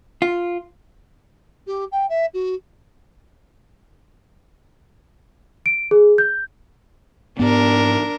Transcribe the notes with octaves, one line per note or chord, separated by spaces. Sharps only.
F4
G4
G5
E5
F#4
D7
G#4
G6
G#2 B3 D4 A#4